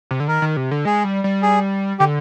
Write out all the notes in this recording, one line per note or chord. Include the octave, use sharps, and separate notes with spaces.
C3
D3
D#3 A#4
D#3
C3
D3
G#3 G#4
G3
G3
G#4
D3 G4